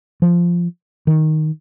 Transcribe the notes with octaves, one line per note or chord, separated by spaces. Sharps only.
F3
D#3